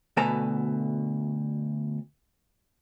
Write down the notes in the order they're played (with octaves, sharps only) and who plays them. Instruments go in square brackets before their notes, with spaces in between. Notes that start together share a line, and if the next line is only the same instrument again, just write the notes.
[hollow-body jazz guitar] D2 B2 A4 B4 G#5 A#5